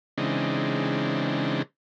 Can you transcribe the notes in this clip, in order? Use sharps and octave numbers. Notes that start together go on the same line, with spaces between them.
C#3 E3 G#3 C4 D4 D#4